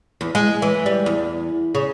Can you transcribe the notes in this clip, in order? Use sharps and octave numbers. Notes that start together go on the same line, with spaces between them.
E2
G#3
E3
G3
E2
C#3